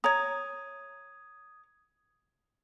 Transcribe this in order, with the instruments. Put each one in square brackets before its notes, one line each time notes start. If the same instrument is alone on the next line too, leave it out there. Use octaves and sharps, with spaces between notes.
[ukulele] C#5 A#5 [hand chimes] D#6 G#6